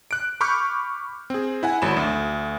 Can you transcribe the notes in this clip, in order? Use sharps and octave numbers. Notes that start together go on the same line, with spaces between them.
F#6 D7
B5 C#6 D6 F6 G6
C4 G#4
E4 F#5 G#5
G#1 F#3 B5 E7
D2